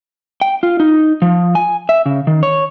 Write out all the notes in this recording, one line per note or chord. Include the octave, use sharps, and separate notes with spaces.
G5
F4
D#4
F3
G#5
E5
C#3
D#3
C#5